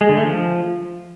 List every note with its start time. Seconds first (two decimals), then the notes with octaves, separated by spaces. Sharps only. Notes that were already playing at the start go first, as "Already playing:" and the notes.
0.01 G#3
0.09 D3
0.17 A3
0.25 F3